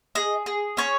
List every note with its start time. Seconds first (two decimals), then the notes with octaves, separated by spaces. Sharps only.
0.15 G#4 D#5
0.46 G#4
0.77 C#4 C#5